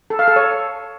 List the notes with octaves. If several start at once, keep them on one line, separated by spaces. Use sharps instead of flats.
A4
F5
A4
C#5